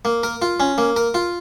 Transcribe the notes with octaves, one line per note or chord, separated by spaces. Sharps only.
A#3
A#4
F4
C#4
A#3
A#4
F4